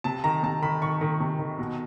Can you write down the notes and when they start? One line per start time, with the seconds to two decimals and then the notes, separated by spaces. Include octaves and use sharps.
0.04 C3 A5
0.24 D#3 A#5
0.43 C3 A5
0.62 D#3 B5
0.82 D#3 C#6
1.01 D#3
1.20 C3
1.39 D#3
1.59 B2